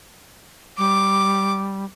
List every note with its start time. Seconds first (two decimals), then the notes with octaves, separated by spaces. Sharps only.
0.78 G3 D6